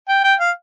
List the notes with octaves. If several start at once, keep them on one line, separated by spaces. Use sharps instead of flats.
G5
G5
F5